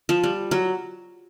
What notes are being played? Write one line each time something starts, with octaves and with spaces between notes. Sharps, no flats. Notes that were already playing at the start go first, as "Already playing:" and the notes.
F3
G3
F#3